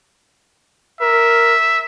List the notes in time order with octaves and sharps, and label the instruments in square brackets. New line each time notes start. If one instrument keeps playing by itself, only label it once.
[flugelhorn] A#4 [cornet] E5